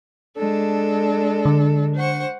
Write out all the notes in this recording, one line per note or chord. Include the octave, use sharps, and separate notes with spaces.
G#3 D4 A4
D3
C5 F#5 C#6